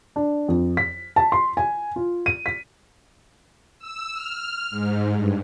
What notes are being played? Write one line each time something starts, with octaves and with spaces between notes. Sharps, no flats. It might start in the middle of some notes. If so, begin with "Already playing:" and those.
D4
F2
B6
A5
C6
G#5
F4
D#7
B6
E6
F6
G#2
G2